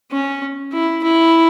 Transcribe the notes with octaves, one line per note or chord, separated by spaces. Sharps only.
C#4
E4
E4